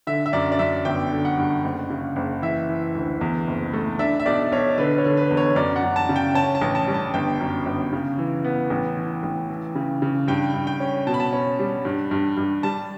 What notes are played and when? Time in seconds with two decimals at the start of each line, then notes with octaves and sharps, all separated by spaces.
0.07 D3 E5
0.26 E5
0.33 F#2 D5
0.52 D5
0.59 F#2 E5
0.85 G1 G5
1.12 D3
1.25 F#5
1.38 G2
1.64 F#1
1.90 C#3
2.16 F#1
2.42 E3 E5
2.69 E3
2.95 D2
3.21 E2
3.47 F#1
3.73 A3
3.99 D4 E5
4.20 E5
4.25 B1 D5
4.52 B1 C#5
4.78 D3 B4
4.98 C#5
5.05 D3
5.17 B4
5.31 E2
5.37 C#5
5.56 F#2 D5
5.76 F#5
5.83 F#2
5.96 A5
6.09 C#3
6.16 G5
6.35 C#4 A5
6.55 A5
6.62 A1
6.75 A5
6.87 G3
6.94 A5
7.14 G1 G5
7.40 F#2
7.66 G1
7.93 C#3
8.18 E3
8.45 B3
8.70 A1
8.97 E3
9.23 A1
9.49 E3
9.75 C#3
10.02 C#3
10.28 G2 G5
10.54 G2
10.67 G5
10.80 C#4
11.07 B2 A5
11.14 B5
11.20 A5
11.33 C#4
11.59 G3
11.85 G2
12.11 G2
12.37 G2
12.63 G3 A5